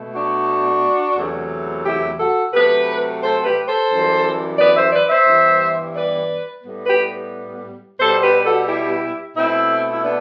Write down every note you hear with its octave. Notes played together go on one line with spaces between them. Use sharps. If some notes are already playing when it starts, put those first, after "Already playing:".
Already playing: B2 A3
D4 F#4
E2 C3 F#3 A3
E4 G4
F#4 A4
C3 F#3 A3 G4 B4
A4 C5
G4 B4
A4 C5
F#2 E3 G3
B4 D5
C5 E5
B4 D5
C5 E5
G2 E3 G3 B3
B4 D5
A2 G3 B3
G4 B4
B2 G3 B3 A4 C5
G4 B4
F#4 A4
E4 G4
B2 A3 C4 E4
E4
B3 D4